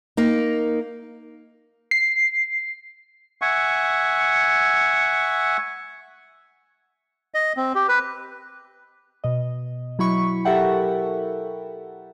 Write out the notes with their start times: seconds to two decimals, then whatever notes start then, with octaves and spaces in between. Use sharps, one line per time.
0.17 A#3 D#4
1.91 C7
3.42 E5 F#5 G#5 C#6
7.34 D#5
7.57 C4
7.75 G4
7.88 B4
9.24 B2 D#5
9.99 F#3 E4 B5 C#6
10.45 G4 A4 A#4 E5 F#5 G5